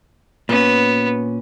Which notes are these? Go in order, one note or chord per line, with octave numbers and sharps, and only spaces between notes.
A#2 B3 C#4